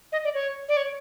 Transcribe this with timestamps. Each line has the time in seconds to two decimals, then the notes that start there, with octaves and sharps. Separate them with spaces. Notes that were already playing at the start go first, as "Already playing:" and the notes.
0.12 D#5
0.24 D5
0.34 C#5
0.69 D5
0.77 C#5